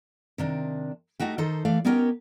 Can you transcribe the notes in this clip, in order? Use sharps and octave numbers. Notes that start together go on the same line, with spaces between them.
C3 D#3 D4
A3 D#4 F#4 G4
D#3 D#4 A4 C5
E3 A3 D5 F5
B3 C#4 D#4 G4 A#4 C#5